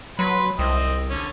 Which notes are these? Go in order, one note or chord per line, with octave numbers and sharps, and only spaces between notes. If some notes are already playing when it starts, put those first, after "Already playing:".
F#3 B4 C6
C2 C4 D#5
D3 C#4